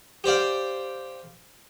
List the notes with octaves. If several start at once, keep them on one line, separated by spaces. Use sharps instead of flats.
G4 C5 D5 F5